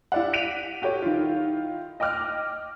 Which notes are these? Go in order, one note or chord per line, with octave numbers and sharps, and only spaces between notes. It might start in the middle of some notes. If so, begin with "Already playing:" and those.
E4 G4 D5 F5 F#5
F#6 B6 D7 D#7 F7
F#4 G4 A4 C#5
D#3 E4 F4
D#5 G5 D6 F6 F#6